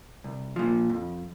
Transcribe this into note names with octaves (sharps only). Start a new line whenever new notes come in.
C2
A#2 F3
F2